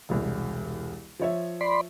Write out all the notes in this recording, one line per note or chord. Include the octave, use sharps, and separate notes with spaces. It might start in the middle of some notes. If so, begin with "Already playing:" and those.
E1 C2
F3 C#5 E5
D5 B5 C6